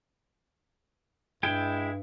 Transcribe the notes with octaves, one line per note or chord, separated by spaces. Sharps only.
G2 G#3 E4 G5